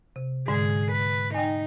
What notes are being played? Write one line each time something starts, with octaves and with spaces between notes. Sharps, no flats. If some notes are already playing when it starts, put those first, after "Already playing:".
C3
G#2 D3 G#3 G#4
B4
D#4 G5 G#5